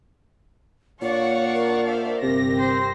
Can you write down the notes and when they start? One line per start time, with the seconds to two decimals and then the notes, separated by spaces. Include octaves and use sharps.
1.02 A#2 D4 C#5 D5 F5 F#5 C#6
1.54 A#4
1.87 C5 E5 F5
2.22 G1 C3 G4 A#6
2.58 C4 C5